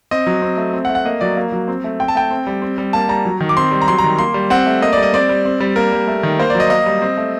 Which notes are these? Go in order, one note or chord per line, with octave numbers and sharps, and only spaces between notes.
C4 D#5
F#3
C4
A3
C4
F#5
A3
F#5
A#3 D#5
F#3 D5
A#3
F#3
C4
A3
C4 G5
A5
A3 G5
C4
G3
C4
G3
A#3 A5
G3 A#5
F#3
D#3
D6
C4 C6
G3
A#5
F#3 C6
A#5
D#3
A#3 C6
G3
C4 F#5
A3
A#3 D#5
G3 D5
D#5
C4 D5
G3
C4
G3
A#3 A#4
G3
A3
D#3
A#3 C5
D5
F#3
D#5
A#3 D#5
G3
C4
A3